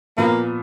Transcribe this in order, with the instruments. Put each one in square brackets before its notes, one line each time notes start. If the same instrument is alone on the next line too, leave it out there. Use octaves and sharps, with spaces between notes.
[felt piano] A#2 F3 B3 [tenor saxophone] A#3